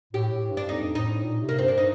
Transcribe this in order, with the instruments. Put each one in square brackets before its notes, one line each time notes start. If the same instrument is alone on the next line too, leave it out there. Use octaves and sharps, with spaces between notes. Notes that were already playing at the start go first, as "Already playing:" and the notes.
[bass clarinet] A2 [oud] G4
[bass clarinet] A2
G2
[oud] D4
[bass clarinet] F2 [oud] D#4
[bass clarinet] A2 [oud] D#4
[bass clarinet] A#2
C3
[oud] A#3
[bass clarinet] G2 [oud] C4
[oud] D4
D#4